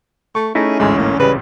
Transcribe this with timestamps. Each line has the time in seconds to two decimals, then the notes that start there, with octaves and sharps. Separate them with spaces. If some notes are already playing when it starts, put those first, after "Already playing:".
0.35 A3 C#6
0.55 A3 C#4 D#4 E4 G#4
0.80 A1 D2 G#2 G#3
0.99 A2 A#3
1.20 C#3 G3 B4